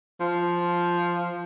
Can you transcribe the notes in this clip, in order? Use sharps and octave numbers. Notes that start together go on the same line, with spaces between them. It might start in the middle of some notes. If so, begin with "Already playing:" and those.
F3